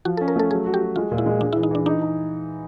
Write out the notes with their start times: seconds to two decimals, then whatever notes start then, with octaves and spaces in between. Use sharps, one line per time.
0.05 F3 F#4
0.17 A4
0.21 C#4
0.28 A#4
0.36 A3 A4
0.51 F#3 G#4
0.66 F#4
0.74 G4
0.81 F#4
0.96 G#3 F4
1.11 A#2
1.18 E4
1.26 G#3
1.41 G#3 D4
1.53 E4
1.56 E3
1.63 D#4
1.71 E3 D4
1.86 D4 D#4
2.01 D#4